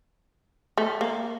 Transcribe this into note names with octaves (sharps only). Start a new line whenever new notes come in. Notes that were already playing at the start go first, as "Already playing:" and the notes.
A3
A#3